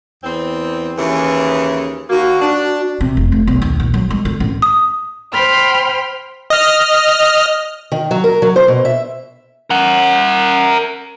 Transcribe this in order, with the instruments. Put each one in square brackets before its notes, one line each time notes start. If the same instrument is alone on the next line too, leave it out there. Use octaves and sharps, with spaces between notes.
[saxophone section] E2 C4
D#2 C#3 E3
[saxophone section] D#2 A#3 [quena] F#4
[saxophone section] D4
[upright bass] C3
F1
A3
B1
D#2
A#1
F#3
G#3
D3
A1
[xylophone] D#6
[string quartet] C5 G5 B5 C6 F6
[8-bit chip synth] D#5 F6
[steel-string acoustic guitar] D#3
F#3
A#4
F#3
C5
B2
E5
[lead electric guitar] A#4 F#5